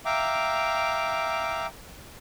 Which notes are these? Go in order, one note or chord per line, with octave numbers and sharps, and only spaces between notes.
E5 F5 G5 A#5 D6